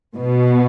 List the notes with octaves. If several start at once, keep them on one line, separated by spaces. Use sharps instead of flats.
B2